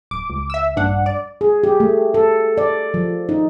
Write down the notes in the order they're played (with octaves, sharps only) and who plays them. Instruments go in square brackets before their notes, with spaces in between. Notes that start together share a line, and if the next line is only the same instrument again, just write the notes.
[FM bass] D1 [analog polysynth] D6
[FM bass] C#2
[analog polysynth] E5 E6
[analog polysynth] A#1 D4 F#5 [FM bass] G2
[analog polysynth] D5
[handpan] G#4
G4
A3
A4
D5
F3
D#4